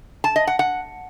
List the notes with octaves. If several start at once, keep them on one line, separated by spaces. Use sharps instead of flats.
A5
D#5
F#5
F#5